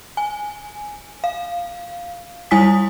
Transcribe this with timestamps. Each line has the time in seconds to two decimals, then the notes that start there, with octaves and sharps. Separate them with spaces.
0.17 G#5
1.24 F5
2.51 G3 E4 G#5 D#6 B6